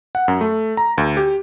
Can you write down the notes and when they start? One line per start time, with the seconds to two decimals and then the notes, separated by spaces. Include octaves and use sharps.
0.15 F#5
0.28 F#2
0.41 A3
0.77 A#5
0.98 D2
1.17 G4